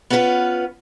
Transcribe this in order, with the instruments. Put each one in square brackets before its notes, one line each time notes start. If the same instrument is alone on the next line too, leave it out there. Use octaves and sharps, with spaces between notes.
[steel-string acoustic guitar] B3 C#4 F4 A#4 B4